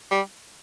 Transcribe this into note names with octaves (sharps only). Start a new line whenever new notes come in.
G3